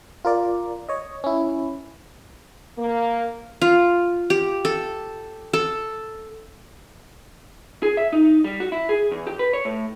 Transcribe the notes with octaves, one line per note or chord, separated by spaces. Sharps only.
F4 A#4 D5
C#5 D#5
C#4 E4
A#3
F4
G4
A4
A4
G#4
E5
D#4
G3
F#4
E4
G#4
E2
G4
B4
C#5
A2